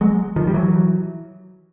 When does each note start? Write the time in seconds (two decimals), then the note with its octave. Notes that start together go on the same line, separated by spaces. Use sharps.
0.01 F#3 G#3
0.36 D#3 F3
0.47 G3
0.54 E3 F#3